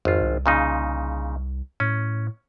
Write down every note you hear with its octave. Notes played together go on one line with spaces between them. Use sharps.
G#1 F2 F4
C2
A#2 C#3 D#4
A2 C#4